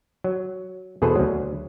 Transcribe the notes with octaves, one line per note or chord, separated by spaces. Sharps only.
F#3
E2 B2 G#4 A4 B4 C5
D2 F#3